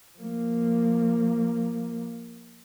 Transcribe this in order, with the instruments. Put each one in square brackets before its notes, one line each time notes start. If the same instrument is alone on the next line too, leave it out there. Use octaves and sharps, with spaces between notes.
[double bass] F3 A#3